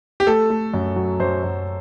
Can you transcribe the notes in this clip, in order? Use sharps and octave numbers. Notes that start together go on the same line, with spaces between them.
G4
A3 A4
A3
F#2
F#3
F#2 C5
F#2